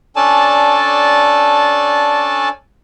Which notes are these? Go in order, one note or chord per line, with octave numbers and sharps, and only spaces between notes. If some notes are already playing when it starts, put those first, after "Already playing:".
C#4 D4 A4 D5 G#5 A5